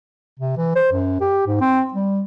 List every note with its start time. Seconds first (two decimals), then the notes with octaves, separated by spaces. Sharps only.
0.39 C3
0.57 E3
0.76 C5
0.92 F#2
1.21 G4
1.47 G#2
1.61 C4
1.93 G3